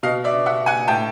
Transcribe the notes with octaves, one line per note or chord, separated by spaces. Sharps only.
B2 D#5 F5
D5 E5
E5 F#5
F#5 G#5
A2 G5 A5